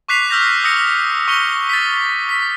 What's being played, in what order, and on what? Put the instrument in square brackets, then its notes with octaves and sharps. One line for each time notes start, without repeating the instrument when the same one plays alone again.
[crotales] C#6 D6 F#6 B6 C7 F7
E6 F6 G6 A#6 F7
D#6 E6 A#6 C#7
C#6 C#7 G7
A6 B6
B6